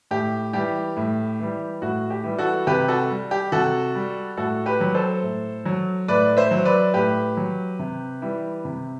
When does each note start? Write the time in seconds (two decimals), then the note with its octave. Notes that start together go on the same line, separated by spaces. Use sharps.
0.11 A2 G4
0.53 E3 G3 G4
0.97 A2
1.39 E3 G3
1.82 A2 F#4
2.10 G4
2.24 E3 G3
2.38 F#4 A4
2.67 C3 G4 B4
2.88 F#4 A4
3.10 G3
3.31 G4
3.52 C3 F#4 A4
3.95 G3
4.37 A2 F#4 A4
4.66 G4 B4
4.81 F#3
4.94 A4 C5
5.23 A2
5.65 F#3
6.08 A2 B4 D5
6.37 C5 E5
6.51 F#3
6.65 B4 D5
6.94 A2 G4 B4
7.37 F#3
7.79 C3
8.22 E3 G3
8.65 C3